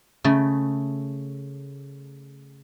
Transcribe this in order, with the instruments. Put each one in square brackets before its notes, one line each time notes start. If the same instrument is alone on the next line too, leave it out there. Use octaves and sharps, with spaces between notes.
[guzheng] C#3 A3